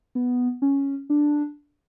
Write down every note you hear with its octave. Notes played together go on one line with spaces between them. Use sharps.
B3
C#4
D4